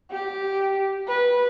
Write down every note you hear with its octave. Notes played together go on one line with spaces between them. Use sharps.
G4
B4